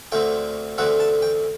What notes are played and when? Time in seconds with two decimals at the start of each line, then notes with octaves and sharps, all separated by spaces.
0.12 D2 D3 A3 C4 G5
0.78 D2 D3 A3 C4 F#5
1.00 A5
1.22 G5